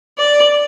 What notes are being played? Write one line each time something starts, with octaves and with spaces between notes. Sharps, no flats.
D5